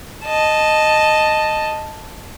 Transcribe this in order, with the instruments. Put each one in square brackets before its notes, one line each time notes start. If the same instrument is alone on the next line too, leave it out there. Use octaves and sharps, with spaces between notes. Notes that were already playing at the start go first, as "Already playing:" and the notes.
[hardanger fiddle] D#5 A5